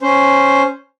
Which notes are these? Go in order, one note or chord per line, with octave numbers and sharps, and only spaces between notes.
C#4 C5